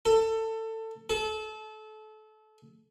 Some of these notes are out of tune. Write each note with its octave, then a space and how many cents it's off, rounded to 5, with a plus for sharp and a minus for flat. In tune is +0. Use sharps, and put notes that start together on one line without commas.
A4 +20
A4 -30